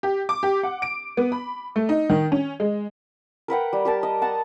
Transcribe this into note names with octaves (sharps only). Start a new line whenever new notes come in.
G4
D6
G4
F#5
D7
B3
B5
A3
D#4
D#3
C#4
G#3
A#4 B4 F#5 G5
G3
G4 A#4 A5
D#5
F#5 A5 A#5